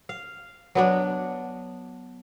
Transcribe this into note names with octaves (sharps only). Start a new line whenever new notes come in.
F5
F#3 B3 D4